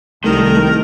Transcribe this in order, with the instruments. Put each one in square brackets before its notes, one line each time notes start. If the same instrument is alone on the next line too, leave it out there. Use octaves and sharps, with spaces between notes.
[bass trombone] C2 [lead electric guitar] D#3 [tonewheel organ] A3 [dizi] A#4